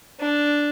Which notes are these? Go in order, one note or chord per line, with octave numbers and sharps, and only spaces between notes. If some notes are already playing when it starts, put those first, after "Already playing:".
D4